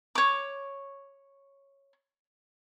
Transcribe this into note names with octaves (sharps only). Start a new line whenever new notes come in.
C#5 D6